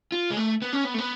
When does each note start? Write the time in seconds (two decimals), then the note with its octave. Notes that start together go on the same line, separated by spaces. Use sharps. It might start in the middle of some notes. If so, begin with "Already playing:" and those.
0.12 F4
0.30 G#3
0.37 A3
0.62 B3
0.73 C#4
0.84 B3
0.94 A3
0.98 B3